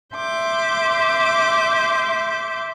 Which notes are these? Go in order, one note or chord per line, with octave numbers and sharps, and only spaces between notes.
E5 C6 D6 G6